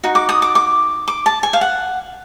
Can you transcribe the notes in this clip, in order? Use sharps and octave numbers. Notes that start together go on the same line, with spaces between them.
D#4 F#4
D6
D#6
D6
D6
D6
A5
G#5
F5
F#5